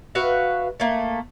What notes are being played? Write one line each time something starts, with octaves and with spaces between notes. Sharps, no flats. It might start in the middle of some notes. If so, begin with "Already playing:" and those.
F#4 B4 E5 F5
A3 A#3